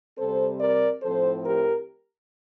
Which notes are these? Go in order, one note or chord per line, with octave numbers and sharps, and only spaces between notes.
C3 G3 C4 A4 C5
A#4 D5
A2 F3 C4 A4 C5
G4 A#4